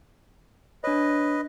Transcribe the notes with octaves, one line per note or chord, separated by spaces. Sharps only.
D4 B4 C#5 D#5